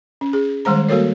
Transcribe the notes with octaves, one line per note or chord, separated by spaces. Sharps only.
C#4
G#4
D#3 G3 G#3 C5 A#5
G3 A#3 F#4 A4 A#4 C#5